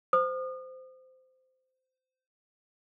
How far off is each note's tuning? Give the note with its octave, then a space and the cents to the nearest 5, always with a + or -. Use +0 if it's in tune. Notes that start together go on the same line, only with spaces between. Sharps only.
C5 -20 D#6 -35